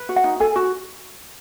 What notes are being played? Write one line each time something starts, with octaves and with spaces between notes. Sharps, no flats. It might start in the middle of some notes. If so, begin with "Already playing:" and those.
Already playing: B4
F#4
F#5
D#4
A4 G#5
F#4